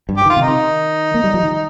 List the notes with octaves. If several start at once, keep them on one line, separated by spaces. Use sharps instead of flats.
G2
G4
D#3 F4
C3
D#4
D#3
A#3
G3
F3
D#3